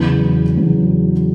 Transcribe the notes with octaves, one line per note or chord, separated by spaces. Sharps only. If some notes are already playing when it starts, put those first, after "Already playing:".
Already playing: E2 C#3 F#3
E2 C#3 F#3